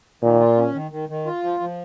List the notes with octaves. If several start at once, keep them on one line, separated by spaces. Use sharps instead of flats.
A#2 D#3
F4
C#4
D#3
D#3
D#3
F4
F3
F3